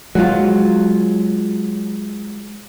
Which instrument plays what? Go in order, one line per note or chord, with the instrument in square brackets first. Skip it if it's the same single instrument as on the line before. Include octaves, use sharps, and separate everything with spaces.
[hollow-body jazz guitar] F#3 F4 [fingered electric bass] G#3